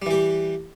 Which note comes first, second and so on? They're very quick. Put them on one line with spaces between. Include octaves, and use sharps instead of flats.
G3 E3 G4